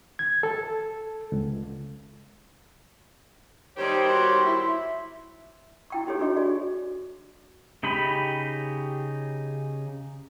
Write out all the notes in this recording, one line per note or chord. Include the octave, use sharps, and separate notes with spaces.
G#6
A4
C#2
D#3 G3 D#4 G4 C5 C#5
F#4 C5 C6
E4 E5
E4 G5 C#6
D#4 G4 A4 C#5
D4 F#4 G#4 A4 D#5 C#6
F#4 G#4 D5 G#5
C#3 D#4 G4 B5